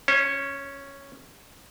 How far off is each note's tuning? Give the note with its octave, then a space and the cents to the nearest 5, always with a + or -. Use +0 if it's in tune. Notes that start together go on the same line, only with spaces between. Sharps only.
C#4 +0 C#5 -45